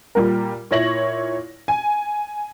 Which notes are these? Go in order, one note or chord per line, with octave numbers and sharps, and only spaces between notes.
A#2 G3 A#3 A#4
A#2 E4 C#5 A#6 F#7
G#5